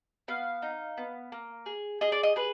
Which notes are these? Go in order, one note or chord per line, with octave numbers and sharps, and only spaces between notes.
B3 F5
D#4
B3
A#3
G#4
G#4 D#5
D5
D#5
G#4 B4